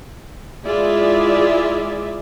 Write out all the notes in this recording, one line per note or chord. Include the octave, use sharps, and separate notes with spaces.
G#3 E4 F4 G#4 D5 E5